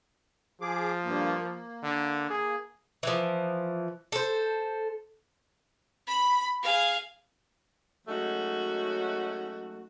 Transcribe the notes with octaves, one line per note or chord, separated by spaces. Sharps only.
F3 G#4 D6
G2 A#3
A#3
D3
G#4
E3 F3
A4 C5
B5
G#4 F5
F#3 G#3 A3 C#4 D#4 F#4